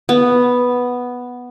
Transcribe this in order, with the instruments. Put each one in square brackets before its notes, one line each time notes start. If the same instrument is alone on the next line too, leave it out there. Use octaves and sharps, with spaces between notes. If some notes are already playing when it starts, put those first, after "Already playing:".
[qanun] B3